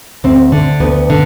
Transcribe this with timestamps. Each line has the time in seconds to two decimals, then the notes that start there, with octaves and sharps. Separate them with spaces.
0.24 D2 C4
0.52 D3
0.80 D2 B3
1.10 D3